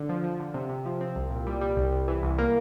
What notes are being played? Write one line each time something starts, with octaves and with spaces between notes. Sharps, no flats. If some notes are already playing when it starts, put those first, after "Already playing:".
Already playing: D3
F3
F3
D3
C3
C3
F3
C4
C2
A#2
G3
G3
C2
C2
E3
C2
A#3